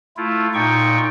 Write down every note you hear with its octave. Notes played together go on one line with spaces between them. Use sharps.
A3 E4 F4
A#2 D#4 G5 C#6